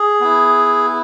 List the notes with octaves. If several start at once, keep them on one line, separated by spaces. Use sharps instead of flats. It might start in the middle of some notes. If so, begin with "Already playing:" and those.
Already playing: G#4
B3 E4